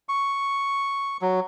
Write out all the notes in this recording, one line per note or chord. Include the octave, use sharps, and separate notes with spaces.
C#6
F#3